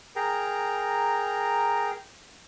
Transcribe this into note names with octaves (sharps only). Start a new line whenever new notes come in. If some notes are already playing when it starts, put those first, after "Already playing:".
G#4 A#4 G5 A#5